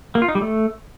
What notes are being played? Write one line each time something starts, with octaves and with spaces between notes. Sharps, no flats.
A#3
F4
D#4
G3
A3